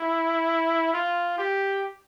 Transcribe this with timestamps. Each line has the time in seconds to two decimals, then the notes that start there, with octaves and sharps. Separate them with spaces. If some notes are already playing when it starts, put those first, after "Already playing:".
Already playing: E4
0.93 F4
1.38 G4